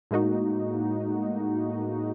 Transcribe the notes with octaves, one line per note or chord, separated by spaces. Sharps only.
A2 G#3 A#3 D#4 F#4